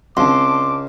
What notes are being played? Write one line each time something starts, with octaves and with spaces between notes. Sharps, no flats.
C#2 C4 D4 A5 C6 D6